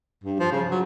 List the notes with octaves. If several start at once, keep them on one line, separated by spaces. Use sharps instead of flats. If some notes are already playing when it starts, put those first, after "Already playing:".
G2
F3
C#3
F#3